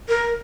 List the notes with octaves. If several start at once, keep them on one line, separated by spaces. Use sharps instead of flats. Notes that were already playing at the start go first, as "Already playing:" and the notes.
A#4